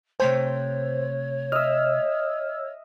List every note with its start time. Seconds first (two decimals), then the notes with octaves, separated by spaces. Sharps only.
0.20 C3 A3 C5 C#5 G5
1.52 D#5 E5 E6 F6